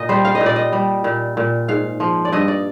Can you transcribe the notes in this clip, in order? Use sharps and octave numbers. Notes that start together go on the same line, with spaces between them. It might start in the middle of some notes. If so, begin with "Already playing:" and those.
Already playing: A#2 D#5
G3 C5
F5
D#5
A#2
D5
D#5
G3
A#2
A#2
G#2 F5
F3
D5
G2 D#5
D5